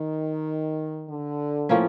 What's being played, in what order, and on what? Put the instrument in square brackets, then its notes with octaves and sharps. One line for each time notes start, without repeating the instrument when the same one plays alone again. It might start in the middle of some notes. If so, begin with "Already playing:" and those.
Already playing: [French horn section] D#3
D3
[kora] A2 F3 A#3 C#4